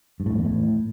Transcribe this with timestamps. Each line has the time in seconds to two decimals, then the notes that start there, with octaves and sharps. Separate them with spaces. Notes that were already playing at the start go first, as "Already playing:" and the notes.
0.20 G2
0.26 A2
0.32 F#2
0.39 E2
0.45 A2